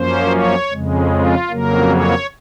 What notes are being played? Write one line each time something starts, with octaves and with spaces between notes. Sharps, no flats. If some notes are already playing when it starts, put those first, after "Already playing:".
Already playing: F#2 F3 A#3 C#4 C5
C#5
F2 C#3 G#3
F4
F2 C#3 F#3 A#3 A#4
C#5